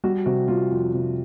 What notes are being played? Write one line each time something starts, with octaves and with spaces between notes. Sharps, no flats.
G3 F#4
C3 F#4
G3 F4
F2
C3